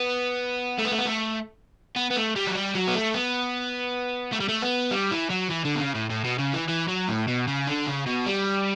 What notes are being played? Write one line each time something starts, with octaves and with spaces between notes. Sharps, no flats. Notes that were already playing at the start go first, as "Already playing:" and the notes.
Already playing: B3
A3
B3
A3
B3
A3
B3
B3
A3
G3
F#3
G3
F#3
B3
A3
B3
A3
G3
A3
B3
G3
E3
F#3
E3
D3
B2
C#3
A2
A2
B2
C#3
E3
E3
F#3
A2
B2
C#3
D3
C#3
B2
G3